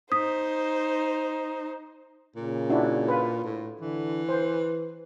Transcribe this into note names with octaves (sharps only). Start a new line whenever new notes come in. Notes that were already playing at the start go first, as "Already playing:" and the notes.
D#4 C5 D#6 B6
A#2 C#3
D4 E4 F#4
F4 B4
A2
D3 E3
B4 C5